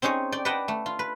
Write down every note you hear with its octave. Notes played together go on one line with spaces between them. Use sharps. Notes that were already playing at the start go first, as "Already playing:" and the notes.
C4 C#4 D#4 G#4 C#5
D5 G5
B4 D5 D#5 F#5 G5 A5
A3
F4
B4